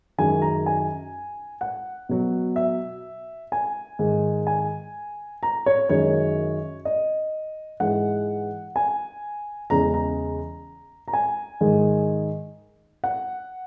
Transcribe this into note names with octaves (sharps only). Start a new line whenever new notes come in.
F#2 D#3 G#3 G#5
A#5
G#5
F#5
B2 F#3
E5
G#5
G#2 D#3 G#3
G#5
A#5
C#5
F#2 D#3 G#3 C#5
D#5
G#2 E3 G#3 F#5
G#5
E2 C#3 G#3 A#5
A#5
A#5
G#5
G#2 D#3 G#3
F#5